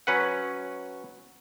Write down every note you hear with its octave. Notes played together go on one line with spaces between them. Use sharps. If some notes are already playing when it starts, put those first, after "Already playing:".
F#3 C#4 B4 F#5